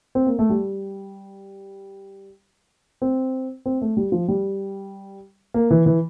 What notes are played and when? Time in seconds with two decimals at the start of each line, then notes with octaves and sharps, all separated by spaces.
0.15 C4
0.26 A#3
0.39 A3
0.50 G3
3.02 C4
3.66 C4
3.81 A3
3.97 G3
4.12 F3
4.28 G3
5.54 A#3
5.71 E3
5.86 E3